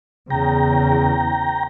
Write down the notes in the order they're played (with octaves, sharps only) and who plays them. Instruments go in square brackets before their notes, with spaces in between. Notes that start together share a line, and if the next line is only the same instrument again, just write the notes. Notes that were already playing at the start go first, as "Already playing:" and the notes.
[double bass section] E2 C#3 [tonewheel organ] G5 A#5